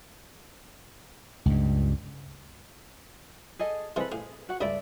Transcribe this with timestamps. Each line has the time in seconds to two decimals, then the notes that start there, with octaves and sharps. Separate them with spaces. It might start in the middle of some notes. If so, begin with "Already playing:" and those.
1.46 C#2 G2
3.59 G#4 A4 D#5
3.96 C3 E3 G#3 A4 B4
4.12 A2 G#4 F5
4.49 F#4 F#5
4.61 C#2 G2 G3 A4 D5 E5